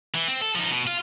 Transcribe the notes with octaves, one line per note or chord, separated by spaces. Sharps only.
E3
C4
A4
F3 D#4
B2
F4